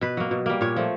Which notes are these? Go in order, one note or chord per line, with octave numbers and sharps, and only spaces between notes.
B2 B4
F#3 A#3
B2
G3 A#3
A#2 C#5
F3 A3